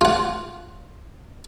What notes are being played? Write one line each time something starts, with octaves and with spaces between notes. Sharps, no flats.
F4 F#5